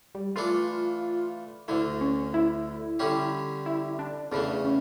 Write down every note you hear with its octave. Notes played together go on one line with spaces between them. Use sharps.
G3
E3 A3 D4 F4 A4
D2 D3 A3 E4
C#4
E4
D3 G3 C#4 G4
E4
D4
E2 C#3 E3 A3 D4
C#4